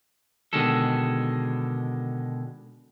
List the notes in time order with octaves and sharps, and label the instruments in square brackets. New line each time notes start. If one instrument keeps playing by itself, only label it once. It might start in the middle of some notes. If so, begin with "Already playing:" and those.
[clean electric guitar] B2 D3 D#3 G#3 A4